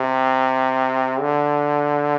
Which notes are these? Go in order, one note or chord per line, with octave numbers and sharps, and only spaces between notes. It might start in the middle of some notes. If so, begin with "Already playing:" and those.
Already playing: C3
D3